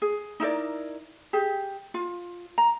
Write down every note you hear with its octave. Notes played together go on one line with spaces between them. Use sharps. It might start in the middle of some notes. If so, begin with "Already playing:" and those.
G#4
D#4 E4 A#4 D5
G4 G#4
F4
A#5